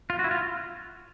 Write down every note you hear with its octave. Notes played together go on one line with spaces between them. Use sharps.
F4
F#4
E4
F4